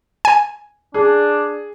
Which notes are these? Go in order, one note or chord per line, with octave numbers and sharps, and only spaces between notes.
G#5
D4 G#4